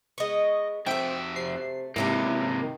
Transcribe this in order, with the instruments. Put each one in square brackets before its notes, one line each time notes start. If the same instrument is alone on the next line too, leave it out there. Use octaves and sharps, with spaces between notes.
[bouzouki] G#3 B3 [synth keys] D#5 C#6
[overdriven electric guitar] F2 E5 [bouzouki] A3 F#4 [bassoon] C4 [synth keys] G5 D7
[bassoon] C3 [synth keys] C7
[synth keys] G#2 [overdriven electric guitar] C3 A#3 [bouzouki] E3 C#4 G4 [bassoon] E4
[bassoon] D#3